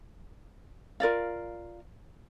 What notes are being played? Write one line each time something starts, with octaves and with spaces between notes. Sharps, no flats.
F4 A#4 D5 F5